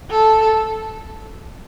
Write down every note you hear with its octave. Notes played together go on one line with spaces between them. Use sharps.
A4